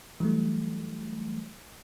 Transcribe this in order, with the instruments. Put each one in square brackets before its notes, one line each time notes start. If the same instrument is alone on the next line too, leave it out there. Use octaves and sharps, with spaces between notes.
[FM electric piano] E3 F#3 G3 A3